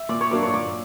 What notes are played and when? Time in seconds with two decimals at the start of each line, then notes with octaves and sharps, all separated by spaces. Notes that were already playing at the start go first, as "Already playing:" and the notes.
Already playing: E5
0.09 A#2 D5
0.21 C#5
0.31 F#3 A#3 D4 D5
0.43 C#5
0.54 A#2 D5